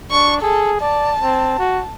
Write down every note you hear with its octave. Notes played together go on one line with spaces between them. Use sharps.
D4 C#6
G#4 A4
D5 A5
C4
F#4